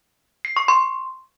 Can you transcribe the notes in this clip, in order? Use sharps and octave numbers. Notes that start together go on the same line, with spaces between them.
C7
C#6
C6